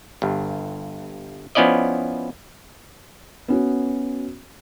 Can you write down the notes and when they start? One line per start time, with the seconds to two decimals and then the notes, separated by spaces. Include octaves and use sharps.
0.22 G1 G2
1.55 F3 B3 C#4 E4 D5 D#5
3.48 B3 C#4 F#4